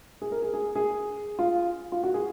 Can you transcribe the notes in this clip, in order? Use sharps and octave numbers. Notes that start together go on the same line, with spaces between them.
G#4
A#4
G#4
G#4
G#4
F4
F4
F#4
G#4